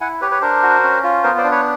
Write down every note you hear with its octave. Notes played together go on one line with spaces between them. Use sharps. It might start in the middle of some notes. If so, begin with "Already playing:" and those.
E4 F#5 G#5
G4 B4 C#5
B4 C#5
D4 A#4 C5
F#4
C#4
F4
B3 A#4 C5
C5 D5
D4
B4 C#5